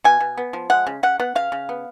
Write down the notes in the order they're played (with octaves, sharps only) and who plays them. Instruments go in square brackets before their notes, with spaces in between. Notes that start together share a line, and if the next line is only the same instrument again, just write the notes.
[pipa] B2 G#5
B2
B3
F3
G#3 F#5
C#3
C#3 F#5
B3 F#5
C#3 F5
C#3
B3